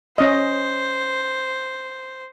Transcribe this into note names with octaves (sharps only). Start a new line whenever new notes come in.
C#4 C5 D#5